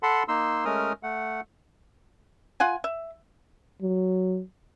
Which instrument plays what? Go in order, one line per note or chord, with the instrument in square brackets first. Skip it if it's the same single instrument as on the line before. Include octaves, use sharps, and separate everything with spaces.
[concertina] A4 F#5 A5 B5 C6
A#3 D#4 C6 E6
G#3 A3 C#4 A#4 D#6 F6
A3 F#5
[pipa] F4 F#5 G#5
E5
[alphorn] F#3